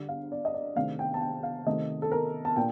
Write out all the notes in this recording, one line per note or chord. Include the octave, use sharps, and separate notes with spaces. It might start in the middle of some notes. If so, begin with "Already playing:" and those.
Already playing: D3 G3 D4
F5
D5
D#5
D5
C3 D#3 A3 D4 F5
G5
A5
G5
F5
C3 D#3 A3 D#5
A4
A#4
A5
A#2 G5